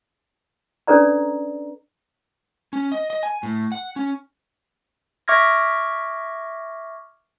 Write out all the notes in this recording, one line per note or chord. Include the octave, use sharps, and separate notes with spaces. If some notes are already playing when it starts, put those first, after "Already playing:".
C#4 D4 A4 B4 D5 A#5
C#4
D#5
D#5
G#5
A2
F#5
C#4
E5 C#6 D6 F6 G#6 A#6